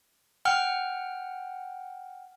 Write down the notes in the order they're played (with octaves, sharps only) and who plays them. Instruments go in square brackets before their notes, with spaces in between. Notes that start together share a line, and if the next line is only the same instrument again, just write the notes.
[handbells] F#5 G5 F6